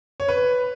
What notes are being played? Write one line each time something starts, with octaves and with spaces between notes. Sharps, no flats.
C#5
B4